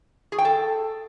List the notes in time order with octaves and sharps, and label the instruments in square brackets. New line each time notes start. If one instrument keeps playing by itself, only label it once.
[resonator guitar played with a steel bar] G#4
G5
A4